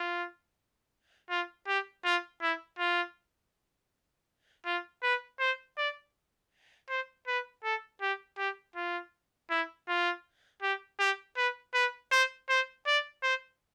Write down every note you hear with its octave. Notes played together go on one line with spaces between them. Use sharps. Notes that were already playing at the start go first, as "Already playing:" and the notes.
Already playing: F4
F4
G4
F4
E4
F4
F4
B4
C5
D5
C5
B4
A4
G4
G4
F4
E4
F4
G4
G4
B4
B4
C5
C5
D5
C5